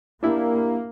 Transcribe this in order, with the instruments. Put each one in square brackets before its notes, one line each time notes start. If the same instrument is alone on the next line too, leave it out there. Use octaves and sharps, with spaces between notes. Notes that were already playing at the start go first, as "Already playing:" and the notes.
[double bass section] A#3 [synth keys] D4 E4 G4